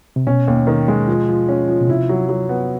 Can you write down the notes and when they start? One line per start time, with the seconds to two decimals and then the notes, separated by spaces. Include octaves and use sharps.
0.16 C3
0.27 B2 C#4
0.48 D#2
0.67 D#3
0.88 G#3
1.08 F3
1.28 F3
1.49 C#4
1.68 F3
1.81 B2
1.88 C3 E4
2.09 F#3
2.29 F#3
2.49 B3